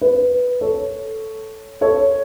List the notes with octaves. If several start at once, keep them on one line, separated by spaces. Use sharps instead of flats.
B4
A4 C#5
A4 C#5